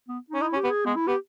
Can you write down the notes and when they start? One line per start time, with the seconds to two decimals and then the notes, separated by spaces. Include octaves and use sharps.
0.09 B3
0.31 C#4 D#4
0.41 D#4 E4
0.53 C#4
0.56 G4
0.64 B3
0.71 G#4
0.86 G#3 B3
0.96 E4
1.07 B3 G4